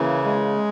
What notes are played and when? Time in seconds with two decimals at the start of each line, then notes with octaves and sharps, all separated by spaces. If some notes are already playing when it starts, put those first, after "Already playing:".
Already playing: C#3 E3 A#3
0.24 G#3